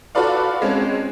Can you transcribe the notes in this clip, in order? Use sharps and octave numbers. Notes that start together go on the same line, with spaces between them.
F4 F#4 A4 B4 D5 F5
G#3 C4 C#4